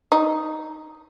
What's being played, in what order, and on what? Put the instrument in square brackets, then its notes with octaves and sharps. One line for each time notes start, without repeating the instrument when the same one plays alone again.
[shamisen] D#4